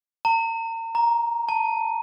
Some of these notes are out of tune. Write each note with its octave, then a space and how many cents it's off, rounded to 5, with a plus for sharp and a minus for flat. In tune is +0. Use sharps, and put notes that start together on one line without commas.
A#5 -40
A#5 +5
A5 +15